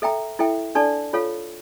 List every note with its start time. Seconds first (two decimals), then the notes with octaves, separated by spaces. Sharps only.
0.02 A4 E5 G5 A#5
0.39 E4 A4 E5 G5
0.75 D4 A4 D5 A5 C#6
1.13 F4 A4 C#5 F5